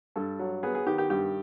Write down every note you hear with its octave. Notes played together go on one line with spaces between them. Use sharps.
G2 A4
F#3
B3 G#4
G#4
D#3 G4
G4
G2 G4